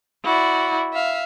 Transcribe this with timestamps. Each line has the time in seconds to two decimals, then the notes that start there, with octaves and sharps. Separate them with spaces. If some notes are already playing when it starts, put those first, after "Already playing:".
0.24 E4 F#4 D5
0.94 E5 F5